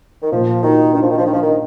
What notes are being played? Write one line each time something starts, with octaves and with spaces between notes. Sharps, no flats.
D#3
A#2 F3
D#3 F#4
D#3 D4
F3
D#3
F3
D#3 D4
F3
D#3